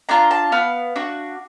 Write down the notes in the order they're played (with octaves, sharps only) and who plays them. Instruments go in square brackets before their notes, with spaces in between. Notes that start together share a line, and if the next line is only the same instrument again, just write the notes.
[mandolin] D4 F4 A#5
A5
B3 F5
D4 F#4